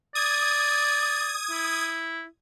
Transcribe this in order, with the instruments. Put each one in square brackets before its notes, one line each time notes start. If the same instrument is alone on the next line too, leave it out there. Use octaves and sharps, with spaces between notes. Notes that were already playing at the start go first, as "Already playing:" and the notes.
[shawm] D5 [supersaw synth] D#6 G#6
[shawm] E4